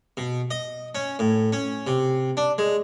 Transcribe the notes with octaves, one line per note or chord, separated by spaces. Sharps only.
B2
D#5
C#4
A2
C#4
C3
D4
G#3